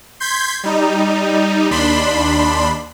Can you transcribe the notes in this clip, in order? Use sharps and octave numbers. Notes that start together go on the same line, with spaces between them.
C6 G6 G#6 B6
G3 D#4
D#2 D4 B5 C6